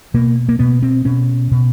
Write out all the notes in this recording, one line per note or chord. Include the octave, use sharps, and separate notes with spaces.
B2 A#3
A#3
B2 B3
C4
B2 C#4
B2